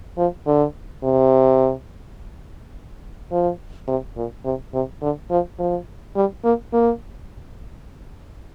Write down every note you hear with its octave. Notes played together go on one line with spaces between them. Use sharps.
F3
D3
C3
F3
C3
A#2
C3
C3
D3
F3
F3
G3
A#3
A#3